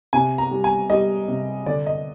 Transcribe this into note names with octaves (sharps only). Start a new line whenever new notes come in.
C3 G#5
A#5
G3
G#5
G3 D#5
C3
D3 D5
D#5